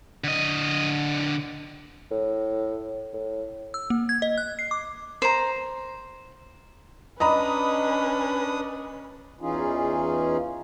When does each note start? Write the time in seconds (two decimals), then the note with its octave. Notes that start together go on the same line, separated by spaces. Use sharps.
0.24 D3 D#5
2.11 A2
3.14 A2
3.74 E6
3.90 A#3
4.09 G#6
4.22 D#5
4.38 F#6
4.59 C7
4.71 D6
5.22 C5 A#5
7.20 C#4 D4 B4 D#5 A#5 B5 D#6
9.41 E2 E3 C#4 D#4 F4 G#4